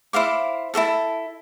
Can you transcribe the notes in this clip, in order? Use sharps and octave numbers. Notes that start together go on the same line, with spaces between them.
E4 C5 F5 D6
E4 F#4 A4 A5